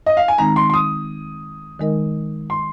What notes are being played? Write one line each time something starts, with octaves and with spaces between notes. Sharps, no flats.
D#5
F5
G#5
D#3 G#3 C4 D#4 A#5
C6
C6
D#6
D#3 G#3 D#4 A#4 D#5
C6